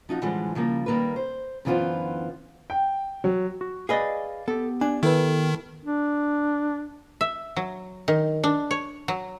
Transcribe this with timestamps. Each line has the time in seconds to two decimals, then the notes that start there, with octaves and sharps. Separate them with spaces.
0.09 F3 D#4 F4 F#4
0.21 A2 D3 E3 F3 G3 G#3
0.55 C#3 F3 G3 A#3
0.86 D#3 G3 A#3 A#4 B4
1.16 C5
1.65 F#2 D3 E3 B3 F4 C5
2.70 G5
3.24 F#3
3.61 F#4
3.89 G#4 B4 D5 D#5 F5
4.48 B3 G4 A4
4.81 D4 G#5
5.03 D#3 E4 A4 B4
5.85 D4
7.21 E5
7.56 F#3
8.08 D#3
8.44 D4
8.71 C#5
9.08 F#3